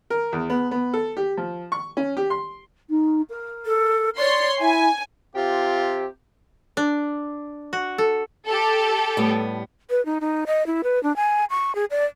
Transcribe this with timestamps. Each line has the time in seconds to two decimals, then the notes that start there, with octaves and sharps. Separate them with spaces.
0.10 A#4
0.32 E2
0.50 B3
0.71 B3
0.93 A4
1.17 G4
1.37 F3
1.72 C#6
1.97 C#4
2.17 G4
2.30 C6
2.89 D#4
3.29 A#4
3.66 A4
4.17 C#5 D5 C6
4.60 E4 E5 G#5
5.35 C3 F4 G4
6.77 D4
7.73 F#4
7.98 A4
8.48 G4 A4
9.17 A2 G3 B3
9.90 B4
10.06 D#4
10.21 D#4
10.47 D#5
10.67 E4
10.84 B4
11.03 D4
11.16 G#5
11.50 C#6
11.75 G#4
11.91 D5